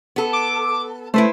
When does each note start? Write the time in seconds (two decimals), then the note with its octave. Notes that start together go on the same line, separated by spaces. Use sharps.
0.16 B3 A4
0.33 D6
1.14 A3 E4 B4 C5